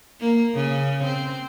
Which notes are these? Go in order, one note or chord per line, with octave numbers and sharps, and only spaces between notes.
A#3
C#3
C4